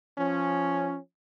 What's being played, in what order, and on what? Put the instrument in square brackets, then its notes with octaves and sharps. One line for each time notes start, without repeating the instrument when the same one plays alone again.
[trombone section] F3 C#4